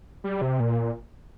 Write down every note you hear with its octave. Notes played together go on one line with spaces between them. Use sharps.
G3
C3
A#2